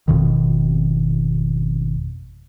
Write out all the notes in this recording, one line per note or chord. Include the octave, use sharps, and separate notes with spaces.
G#1 F2 B2 D#3